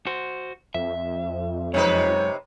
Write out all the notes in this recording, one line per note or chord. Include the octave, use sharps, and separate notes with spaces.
F#4 C5
F2 E5
F#2 C3 G#3 D#4 B4 C#5